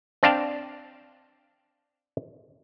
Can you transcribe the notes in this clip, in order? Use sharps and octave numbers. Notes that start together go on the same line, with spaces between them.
C4 D4 D5 F5 G5 A5